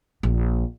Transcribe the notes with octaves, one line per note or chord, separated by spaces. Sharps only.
A#1